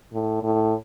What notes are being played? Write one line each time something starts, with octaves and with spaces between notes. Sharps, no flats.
A2
A2